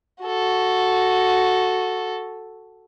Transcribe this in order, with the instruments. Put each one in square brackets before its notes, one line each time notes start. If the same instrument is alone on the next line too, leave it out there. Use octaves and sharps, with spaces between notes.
[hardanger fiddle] F#4 A4